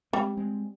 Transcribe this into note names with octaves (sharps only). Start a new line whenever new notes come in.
G3 G#3 C4
G#3 C4